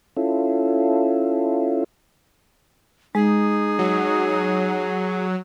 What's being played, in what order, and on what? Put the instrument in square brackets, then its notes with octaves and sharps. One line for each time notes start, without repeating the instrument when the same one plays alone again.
[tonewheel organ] C#4 E4 F4 A4
[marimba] G#3 [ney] D#4 [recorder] G#4
[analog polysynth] F#3